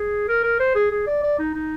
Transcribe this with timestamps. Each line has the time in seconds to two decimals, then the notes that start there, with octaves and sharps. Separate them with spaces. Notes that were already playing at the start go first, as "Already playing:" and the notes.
Already playing: G#4
0.28 A#4
0.44 A#4
0.60 C5
0.75 G#4
0.91 G#4
1.07 D5
1.23 D5
1.39 D#4
1.54 D#4